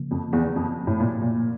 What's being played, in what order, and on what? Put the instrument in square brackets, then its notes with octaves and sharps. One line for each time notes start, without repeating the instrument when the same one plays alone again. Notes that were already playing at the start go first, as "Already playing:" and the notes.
Already playing: [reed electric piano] C#3 F3 A#3
[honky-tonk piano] F2
E2
F2
A2
A#2
A#2